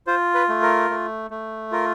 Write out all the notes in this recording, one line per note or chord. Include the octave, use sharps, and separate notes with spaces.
F4 C5
B4
A3
A#4
A3
A3
F4 A#4